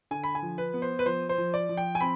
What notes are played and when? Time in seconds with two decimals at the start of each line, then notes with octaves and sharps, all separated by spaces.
0.11 D3 G#5
0.23 B5
0.35 G#5
0.42 F3
0.58 B4
0.74 B3
0.82 C5
0.99 B4
1.06 F3 C5
1.29 C5
1.38 F3
1.54 D5
1.69 F3
1.77 G5
1.95 G#5
2.01 C4 B5